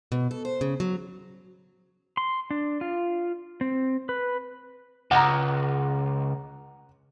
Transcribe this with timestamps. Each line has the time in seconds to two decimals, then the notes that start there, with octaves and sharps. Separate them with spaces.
0.12 B2
0.31 A4
0.45 C5
0.61 C#3
0.80 F#3
2.17 C6
2.51 D4
2.81 F4
3.61 C4
4.09 B4
5.11 C#2 F#5 A#5